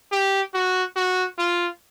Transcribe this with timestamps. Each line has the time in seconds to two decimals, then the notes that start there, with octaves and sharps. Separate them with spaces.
0.12 G4
0.54 F#4
0.96 F#4
1.38 F4